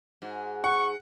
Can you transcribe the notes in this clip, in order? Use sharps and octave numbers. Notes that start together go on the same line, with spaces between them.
G#2 F#4
F#5 C#6